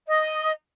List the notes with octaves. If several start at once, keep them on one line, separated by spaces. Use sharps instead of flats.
D#5